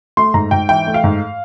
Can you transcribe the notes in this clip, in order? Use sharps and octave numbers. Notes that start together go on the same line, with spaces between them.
A3 C6
G#2 A#5
G#2 G5
E3 G5
A3
F5
G#2